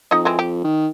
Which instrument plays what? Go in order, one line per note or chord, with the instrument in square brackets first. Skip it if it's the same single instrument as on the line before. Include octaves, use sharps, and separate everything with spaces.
[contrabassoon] F2 [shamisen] D#4 D#5
[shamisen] E3 G#3 C4
G4
[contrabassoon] D#3